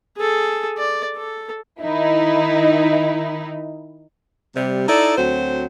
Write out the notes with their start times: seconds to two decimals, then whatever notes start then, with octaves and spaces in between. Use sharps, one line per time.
0.17 G#4 A4
0.78 D5
1.16 A4
1.82 D#3 D#4 E4
4.56 C3 G3
4.88 D#4 E4 A4 D5
5.17 D2 F#3 C4 C5